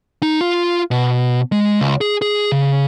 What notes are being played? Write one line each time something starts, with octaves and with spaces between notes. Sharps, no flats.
D#4
F4
B2
G#3
C#2
G#4
G#4
C#3